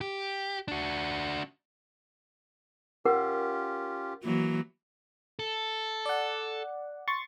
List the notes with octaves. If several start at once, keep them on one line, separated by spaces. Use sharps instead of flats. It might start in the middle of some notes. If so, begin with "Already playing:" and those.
G4
D4 F#4
C#4 F4 G4 A#4 F#5
E3 F#3 A#3
A4
D5 F#5
C6 C#6 A6